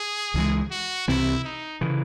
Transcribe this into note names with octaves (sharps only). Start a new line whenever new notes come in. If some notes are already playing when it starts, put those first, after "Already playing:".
Already playing: G#4
C#2 C3 E3 G#3
F#4
C2 C3 E3 C4 E4
D#4
C#3 E3